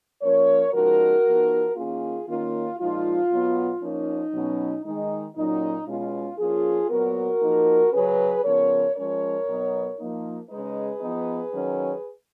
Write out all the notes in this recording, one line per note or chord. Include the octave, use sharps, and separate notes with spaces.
F3 A#3 C#4 A#4 C#5
C#3 F3 G#3 D#4 F#4 A#4
F3 B3 D#4
D#3 A#3 C#4 F4 G#4
D#3 A#3 C#4 F4
A#2 F3 G#3 D#4 F4
B2 F#3 B3
F3 A#3 C#4 D#4
B2 F#3 C#4
D#3 G#3 D#4
A#2 F#3 C#4 D#4
B2 G#3 C#4 F4
F3 A#3 C#4 F4 G#4
A#2 F#3 B3 F#4 A#4
F3 A#3 D#4
C#3 F#3 C#4 G#4 B4
C#3 F3 B3 A#4 C#5
F3 G#3 C#4 A#4 C#5
B2 F#3 B3 D#4
F3 A#3 D#4
C#3 G#3 D#4 G#4 B4
F3 B3 D#4
D#3 F#3 C#4